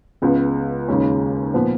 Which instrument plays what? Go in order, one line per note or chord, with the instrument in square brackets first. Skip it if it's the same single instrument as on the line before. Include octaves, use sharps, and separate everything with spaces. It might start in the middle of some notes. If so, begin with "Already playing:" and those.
[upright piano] C#2 C#3 G#3 B3
D#2 C#3 G#3 C#4
A#2 F3 B3